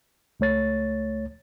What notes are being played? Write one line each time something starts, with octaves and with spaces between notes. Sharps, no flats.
C#2 A3 C#5 A6